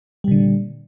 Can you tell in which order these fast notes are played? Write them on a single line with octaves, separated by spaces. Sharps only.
G3 A#2 D3